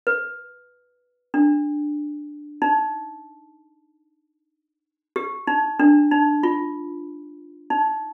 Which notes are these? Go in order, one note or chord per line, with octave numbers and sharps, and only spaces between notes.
B4
D4
D#4
G4
D#4
D4
D#4
F4
D#4